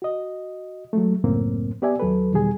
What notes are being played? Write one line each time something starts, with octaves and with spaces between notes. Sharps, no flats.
F#4 D#5
F#3 G#3 A3
C#2 F#2 A2 A#3 C4
B3 G4 D5 E5 G#5
D#2 F#3 A4 B4
E2 B2 D#3 G3 G#4 G#5